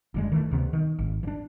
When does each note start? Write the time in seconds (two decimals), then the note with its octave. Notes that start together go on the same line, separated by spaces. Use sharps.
0.14 F#1 D3 G#3
0.32 D#3 E3 G#3 A3
0.51 D2 C3 B3
0.73 D#3
0.99 G#1
1.23 E3 D4